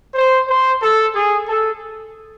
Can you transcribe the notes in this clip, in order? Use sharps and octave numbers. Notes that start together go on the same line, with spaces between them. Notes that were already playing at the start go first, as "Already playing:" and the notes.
C5
C5
A4
G#4
A4